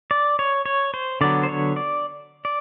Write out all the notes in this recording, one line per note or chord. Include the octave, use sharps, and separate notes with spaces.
D5
C#5
C#5
C5
D3 F#3 B3 D5
C5
C#5
D5
D5